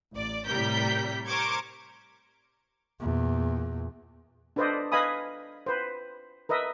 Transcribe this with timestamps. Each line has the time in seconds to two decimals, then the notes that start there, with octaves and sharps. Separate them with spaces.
0.14 A1 D5
0.46 A2 C3 G3 A#4 G6 B6
1.27 A#4 C5 C#6 D6 G#6
3.00 E2 A#2
4.56 D4 A4 B4 C5 D5 D#5
4.92 B4 D#5 F5 G#5 B5 D#6
5.66 B4 C5
6.49 A#4 B4 D#5 E5